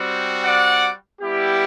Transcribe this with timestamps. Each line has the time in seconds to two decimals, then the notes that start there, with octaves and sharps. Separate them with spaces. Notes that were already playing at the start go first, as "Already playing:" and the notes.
Already playing: G3 C4 F#4
0.44 D5 F#5
1.22 G3 B3 E4 G4